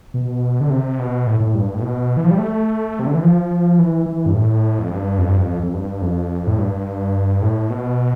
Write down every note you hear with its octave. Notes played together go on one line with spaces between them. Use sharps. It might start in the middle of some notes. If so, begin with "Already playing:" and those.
B2
D3
C3
B2
A2
A2
G2
A2
B2
E3
F3
G3
A3
C3
D3
E3
F3
E3
E3
G2
A2
F2
G2
F2
G2
F2
F2
G2
F2
A2
G2
A2
B2